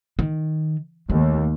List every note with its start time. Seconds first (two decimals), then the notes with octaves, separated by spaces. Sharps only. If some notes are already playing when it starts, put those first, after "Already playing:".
0.19 D#3
1.10 D#2 A3